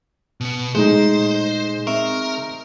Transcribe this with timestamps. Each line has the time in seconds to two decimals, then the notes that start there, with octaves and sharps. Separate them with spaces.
0.41 B2 B3
0.75 A#2 G#3 A3 D#4 C5
1.87 C4 A#4 E5 C#6